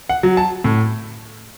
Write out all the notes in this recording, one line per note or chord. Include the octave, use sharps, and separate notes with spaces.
F#5
F#3
A5
A2